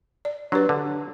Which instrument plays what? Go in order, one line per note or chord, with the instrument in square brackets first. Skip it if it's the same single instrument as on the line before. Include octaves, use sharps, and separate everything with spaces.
[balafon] D5
[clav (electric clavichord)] F#3 [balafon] D4 G4 B4
[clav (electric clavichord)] D3